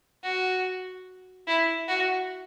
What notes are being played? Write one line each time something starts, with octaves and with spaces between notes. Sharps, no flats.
F#4
E4
F#4